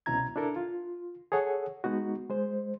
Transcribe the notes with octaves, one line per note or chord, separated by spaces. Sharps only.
C2 B2 C#4 E4 A#5 G#6
D4 E4 A4 A#4
F4
G#4 A4 C#5 F#5
G#3 B3 D#4 F#4
G#3 C5